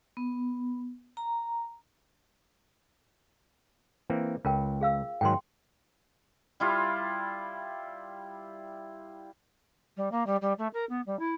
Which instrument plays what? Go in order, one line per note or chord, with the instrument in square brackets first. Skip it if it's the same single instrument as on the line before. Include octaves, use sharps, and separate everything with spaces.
[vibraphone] B3
A#5
[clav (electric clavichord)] E3 A#3 C4
[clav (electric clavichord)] C#2 [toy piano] F4 A#4 G5
[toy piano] G#4 F5 E6
[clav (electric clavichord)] G#2 D#3 F#3 [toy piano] G5 C6
[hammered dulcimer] G3 E4 F4
[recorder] G3
A#3
G3
G3
A3
A#4
B3
G3
E4